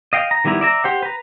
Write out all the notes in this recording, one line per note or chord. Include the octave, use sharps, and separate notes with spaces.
D#5 F5 G5
A#5
D#3 G3 B3 E4 A#5
D5 E5 A#5
G4 C5 F#5
B4 A#5